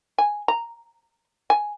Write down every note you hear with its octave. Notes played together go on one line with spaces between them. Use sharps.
G#5
A#5
G#5